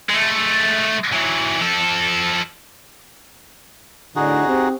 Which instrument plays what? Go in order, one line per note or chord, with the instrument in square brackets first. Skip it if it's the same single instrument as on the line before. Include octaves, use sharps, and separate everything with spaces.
[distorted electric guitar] G#3 A3
E3 F#3
F3 A4
[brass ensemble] A2 D3 [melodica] D#4 F#4 G#4
[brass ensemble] C4 G4